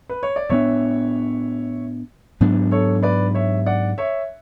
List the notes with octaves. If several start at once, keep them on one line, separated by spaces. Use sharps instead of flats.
B4
C#5
D5
A2 G#3 B3 D4 C#5 E5
G#2 F#3 B3 D4
A4 C#5
B4 D5
C#5 E5
D5 F#5
C#5 E5